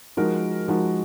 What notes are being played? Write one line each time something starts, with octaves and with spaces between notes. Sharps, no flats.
F3 G#3 D#4 F#4 A#4
F3 G#3 D#4 F#4 A#4